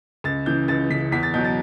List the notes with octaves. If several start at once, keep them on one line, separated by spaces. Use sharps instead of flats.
C#2 A6
C#3 E3 G6
C#2 A6
C#3 E3 B6
E2 B6
A6
B2 F#3 G6
A6